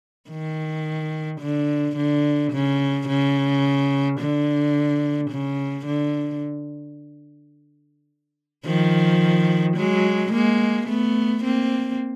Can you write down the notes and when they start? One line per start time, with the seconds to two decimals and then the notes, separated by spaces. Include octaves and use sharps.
0.30 D#3
1.41 D3
1.96 D3
2.53 C#3
3.08 C#3
4.20 D3
5.31 C#3
5.86 D3
8.65 D#3 F3
9.77 F#3 G#3
10.33 G#3 A#3
10.88 A3 B3
11.44 A#3 C4